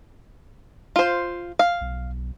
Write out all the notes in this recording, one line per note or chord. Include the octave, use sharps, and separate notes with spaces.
F4 C5
F5
B1